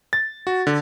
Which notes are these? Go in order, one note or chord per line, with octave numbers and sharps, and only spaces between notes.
A6
F#4
D3